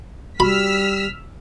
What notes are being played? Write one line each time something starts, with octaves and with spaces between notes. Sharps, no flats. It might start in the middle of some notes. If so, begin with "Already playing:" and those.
G3 F#4 B5 E6 F6 B6